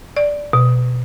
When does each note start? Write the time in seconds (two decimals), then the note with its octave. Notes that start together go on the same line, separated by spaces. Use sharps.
0.17 D5
0.53 B2